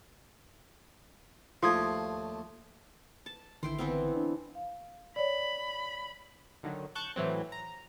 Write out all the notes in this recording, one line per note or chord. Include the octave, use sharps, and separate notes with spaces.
D#2 F3 A3 D4 C6 D#6 G#6
A5
A1 D3 D#3 E4 G5 C6
E3 B3 C4
D4
F5
C#5 D5 B5
D3 D#3 F#3
A5 C#6 F#6 G6
A2 E3 F#3 C4
A#5